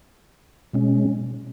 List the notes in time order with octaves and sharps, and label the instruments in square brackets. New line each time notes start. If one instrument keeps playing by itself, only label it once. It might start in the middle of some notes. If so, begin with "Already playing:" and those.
[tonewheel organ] B2 G#3 C#4